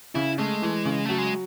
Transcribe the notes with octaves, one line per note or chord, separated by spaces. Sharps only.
C#3 E4
G#3 A3
E3
C#3
F#3 A3
G#3